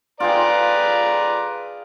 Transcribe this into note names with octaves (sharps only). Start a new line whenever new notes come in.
F4 G#4 B4 D5 G5 A#5